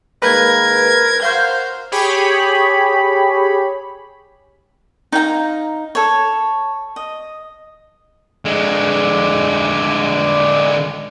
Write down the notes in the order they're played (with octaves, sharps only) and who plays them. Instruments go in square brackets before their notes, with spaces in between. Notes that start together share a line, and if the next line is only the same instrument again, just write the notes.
[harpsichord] D#3 G#3 A#3 [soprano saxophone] A#4 [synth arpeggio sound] B4 [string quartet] G#6
[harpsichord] F#4 A#4 [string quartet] C5 [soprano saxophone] F5 [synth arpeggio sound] G6
[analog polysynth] G4 G#4 C#5 B5
[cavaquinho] D#4 F5 G5 A#5
A4 C#5
D#5
[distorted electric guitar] D3 G#3